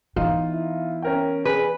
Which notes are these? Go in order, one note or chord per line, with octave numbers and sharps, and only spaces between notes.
E3 B3 D#4 F4
E4
C#4 A#4 G5
G#4 B4